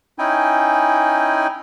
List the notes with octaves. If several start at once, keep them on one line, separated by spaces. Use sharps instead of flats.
C#4 D#4 E4 G5 G#5